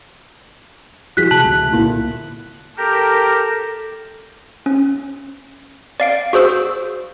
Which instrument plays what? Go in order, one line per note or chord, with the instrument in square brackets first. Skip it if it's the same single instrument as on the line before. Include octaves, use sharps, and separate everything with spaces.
[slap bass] G2 F3 [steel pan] E4 F#4 G#4 [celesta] F#6 B6
[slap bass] C3 E3 G#3 [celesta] A5 [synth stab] F#6
[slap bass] C#2 D3 A3
[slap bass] C2 A#2 D3 [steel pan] A#3 E4
[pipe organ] G4 A#4 [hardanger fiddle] A4
[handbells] C#4
D5 F5 D7
F#4 G#4 C5 E6